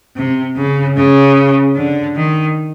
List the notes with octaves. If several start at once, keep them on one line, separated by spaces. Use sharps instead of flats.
C3
C#3
C#3
D3
D#3